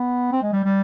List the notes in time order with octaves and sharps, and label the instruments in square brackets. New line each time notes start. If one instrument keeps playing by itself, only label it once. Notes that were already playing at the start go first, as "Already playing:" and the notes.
Already playing: [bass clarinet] B3
C4
G#3
G3
G3